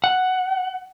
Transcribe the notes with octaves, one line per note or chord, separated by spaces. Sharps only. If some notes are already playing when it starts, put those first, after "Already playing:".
F#5